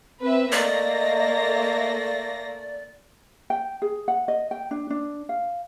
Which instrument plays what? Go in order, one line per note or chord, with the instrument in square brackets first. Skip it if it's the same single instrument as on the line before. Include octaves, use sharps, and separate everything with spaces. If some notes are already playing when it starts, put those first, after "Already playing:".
[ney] C4 [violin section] B4 E5
[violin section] A3 A#3 A#6 [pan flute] D5 [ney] D#5
[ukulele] G5
G#4
F#5
D#5
G5
D4
D4
F5